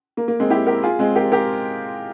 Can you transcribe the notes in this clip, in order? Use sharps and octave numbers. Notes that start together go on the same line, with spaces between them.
A#3
A#3
G#3 C4
E4 G4
G4 A#4
F4 G#4
G#3 C4
G4 A#4
G4 A#4